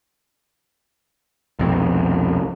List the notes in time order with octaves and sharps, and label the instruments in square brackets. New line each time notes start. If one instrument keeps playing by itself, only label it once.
[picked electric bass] C2 F2 B2